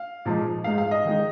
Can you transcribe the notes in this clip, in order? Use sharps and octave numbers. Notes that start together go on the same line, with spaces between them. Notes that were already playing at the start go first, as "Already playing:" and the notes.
Already playing: F5
A#2 F3 G#3 D#4
G#2 G#3 D#4 F5
F5
D#5
D#3 G#3 D#4